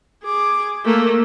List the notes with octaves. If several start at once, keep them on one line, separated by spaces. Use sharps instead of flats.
G#4 D6
A3 A#3